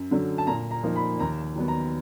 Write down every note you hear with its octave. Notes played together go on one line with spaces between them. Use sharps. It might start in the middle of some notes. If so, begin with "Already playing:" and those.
Already playing: F#2
D3 F#3
A5
A#2 A#5
A#5
F3 A#3 D#4
B5
D#2 A#5
D#3 F#3 B3
A#5